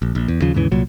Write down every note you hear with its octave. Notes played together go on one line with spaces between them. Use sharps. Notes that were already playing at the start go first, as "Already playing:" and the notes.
A#1
A#1
E2
D#2 C#3 F3
D#2 G#2 C#3 E3
C2 A#2 F#3